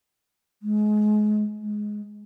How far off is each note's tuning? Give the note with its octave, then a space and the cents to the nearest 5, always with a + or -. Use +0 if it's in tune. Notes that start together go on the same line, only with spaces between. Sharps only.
G#3 +30
G#3 +10